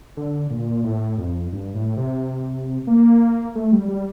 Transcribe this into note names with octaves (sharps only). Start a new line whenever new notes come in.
D3
A#2
A2
F2
G2
A2
C3
A#3
A3
G3
G3